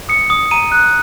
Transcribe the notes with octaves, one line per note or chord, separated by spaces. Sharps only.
D#6 C#7
D#6
A#5 D#7
F#6